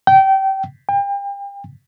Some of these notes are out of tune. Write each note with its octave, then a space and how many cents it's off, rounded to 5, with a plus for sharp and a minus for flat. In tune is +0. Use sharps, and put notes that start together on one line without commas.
G5 -25
G5 +35